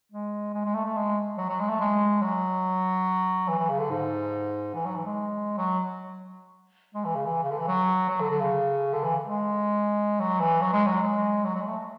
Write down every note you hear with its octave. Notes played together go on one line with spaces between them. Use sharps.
G#3
G#3
G#3
A3
A3
G#3
F#3
F#3
G#3
A3
G#3
F#3
E3
E3
C#3
D3
G#2
E3
F#3
E3
G#3
F#3
G#3
E3
C#3
E3
C#3
D3
E3
F#3
F#3
D3
D3
C#3
D3
E3
G#3
F#3
E3
F#3
G#3
F#3
G#3
F#3
F#3
G#3
A3